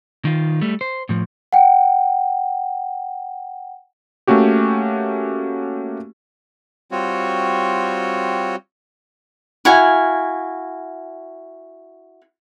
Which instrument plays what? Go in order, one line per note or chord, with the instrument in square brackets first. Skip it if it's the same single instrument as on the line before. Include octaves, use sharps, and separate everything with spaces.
[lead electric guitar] D#3 F4
G3 A3
C5
A2 F3
[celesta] F#5 G5
[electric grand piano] A3 A#3 C#4 F#4 G4
[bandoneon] G3 C4 F4 F#4 C#5
[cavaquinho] E4 F#4 F5 G#5